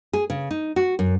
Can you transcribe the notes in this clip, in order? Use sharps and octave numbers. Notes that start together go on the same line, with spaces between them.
G#4
C#3
D#4
F#4
F#2